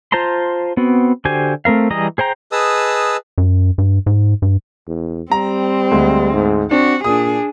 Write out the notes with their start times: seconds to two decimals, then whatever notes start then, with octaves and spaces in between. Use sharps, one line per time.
0.12 F4 C5 A5 A#5 C6
0.77 B3 C4 F#4
1.25 D3 F#4 G4 C5 G#5
1.65 A3 C4 A#4 F5
1.90 E3 G3 G#4 D#5 A#5
2.18 G#4 C5 G5 A#5
2.52 G#4 B4 D#5 A5 D#6 E6
3.38 F#2
3.78 G2
4.06 G#2
4.42 G2
4.87 E2
5.32 G3 C4 A#5
5.91 D2 G#3
6.33 G#2
6.71 C4 D4 F#4
7.04 A#2 D4 G#4 D#6